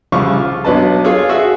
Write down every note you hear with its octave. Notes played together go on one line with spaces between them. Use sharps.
C2 C#3 F3 F5 C#6 D6
F4
B1 B2 D4 B4 D#5 A5
F4 G#4 A4 C#5 F5
F#4 G#4 E5 E6